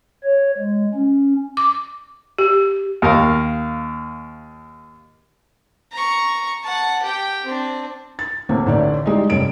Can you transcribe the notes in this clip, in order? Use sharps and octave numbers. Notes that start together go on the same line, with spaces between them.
C#5
G#3
C#4
D6
G4
D#2 A#4 F5
A#5 C#6
F#5 A5
G4 G5
C4 D4
A6
D2 A2 A#3 C4
A1 A2 D3 D#4 D5
G3 G#3 D#4 E4 D5 D#5
F1 G2 C#4 D7